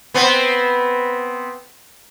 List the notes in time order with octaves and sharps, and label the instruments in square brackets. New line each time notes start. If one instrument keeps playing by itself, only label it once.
[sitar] B3 C4